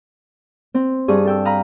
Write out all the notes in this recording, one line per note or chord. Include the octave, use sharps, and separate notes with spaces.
C4
G2 G#4 C#6 D#6
A4 G5 E6
F5 A#5 B5 D#6